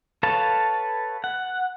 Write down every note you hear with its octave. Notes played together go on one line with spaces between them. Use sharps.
A4 B4 C#5 F5 A5
F#5